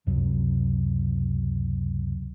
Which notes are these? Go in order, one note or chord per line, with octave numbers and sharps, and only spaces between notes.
C#2 F#2 C3 F#3